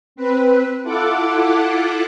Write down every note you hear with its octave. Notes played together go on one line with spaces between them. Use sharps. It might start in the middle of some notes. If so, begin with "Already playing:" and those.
C4 B4
E4 F4 A4 F#5 D6